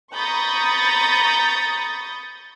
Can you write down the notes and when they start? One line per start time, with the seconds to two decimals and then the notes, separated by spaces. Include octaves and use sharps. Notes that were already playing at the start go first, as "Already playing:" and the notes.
0.14 A#5 B5 C#6 D#6 G6 A6